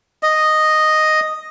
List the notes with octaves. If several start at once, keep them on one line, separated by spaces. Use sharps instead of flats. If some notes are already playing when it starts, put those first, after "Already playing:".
D#5